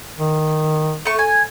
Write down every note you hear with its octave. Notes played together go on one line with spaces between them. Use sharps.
D#3
A3 C#6
G#5